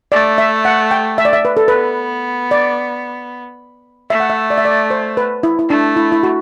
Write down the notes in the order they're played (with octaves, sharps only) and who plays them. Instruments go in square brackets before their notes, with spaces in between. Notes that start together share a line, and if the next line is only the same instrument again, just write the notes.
[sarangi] A3 [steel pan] D5
[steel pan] E5
F#5
G5
E5
D5
E5
B4
A4
[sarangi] B3 [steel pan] B4
[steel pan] D5
[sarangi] A3 [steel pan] E5
[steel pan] F#5
E5
D5
E5
D5
C5
B4
E4
E4
[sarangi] A3 [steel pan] D4
[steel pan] E4
E4
F#4